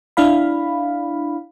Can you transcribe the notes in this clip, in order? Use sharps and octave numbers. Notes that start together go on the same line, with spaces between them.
D4 E4 F5 B5